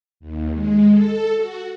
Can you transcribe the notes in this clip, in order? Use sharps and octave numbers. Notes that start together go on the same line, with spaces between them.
D#2
G#3
A4
F#4